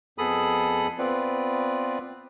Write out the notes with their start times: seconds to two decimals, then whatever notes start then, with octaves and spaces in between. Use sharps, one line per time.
0.18 F2 B3 G#4 A4 B5 D#6
0.98 B3 C4 F4 B4 D5